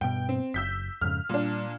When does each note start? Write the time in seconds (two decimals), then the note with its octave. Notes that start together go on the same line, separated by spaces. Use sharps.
0.01 G2 B2 G5
0.29 C4
0.54 F#1 E6 G6 B6
1.01 F2 G#2 C#3 F6
1.29 A#2 G3 D4